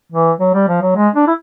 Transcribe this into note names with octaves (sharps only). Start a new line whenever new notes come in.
E3
F#3
G3
F3
F#3
G#3
D4
E4